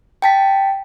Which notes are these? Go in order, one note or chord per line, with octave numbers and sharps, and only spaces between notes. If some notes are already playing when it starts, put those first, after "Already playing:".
G5 A5 B6